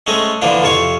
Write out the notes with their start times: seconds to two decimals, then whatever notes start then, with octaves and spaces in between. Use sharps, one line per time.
0.07 G#3 A3 C4 C#4 D#5
0.42 D3 E3 F3 A#3 D4
0.62 F2 C3 F4 C#5 C#6